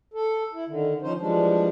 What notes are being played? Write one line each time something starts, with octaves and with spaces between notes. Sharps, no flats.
A4
E4
D3 D#3
F3 C#4 D#4 C5
E3 F3 G3 G#3 D4